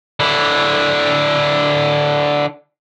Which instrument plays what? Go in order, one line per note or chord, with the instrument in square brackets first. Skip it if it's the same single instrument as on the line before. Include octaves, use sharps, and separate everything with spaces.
[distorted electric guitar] D3 E4